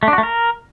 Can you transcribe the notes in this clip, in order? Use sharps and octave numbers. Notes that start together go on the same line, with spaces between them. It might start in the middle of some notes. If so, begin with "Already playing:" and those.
A3
D4
F#4
A3
A#4